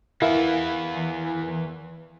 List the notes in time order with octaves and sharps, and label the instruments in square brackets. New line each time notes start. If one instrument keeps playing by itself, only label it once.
[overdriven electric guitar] E3 B3 [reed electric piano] E4 A#4 F5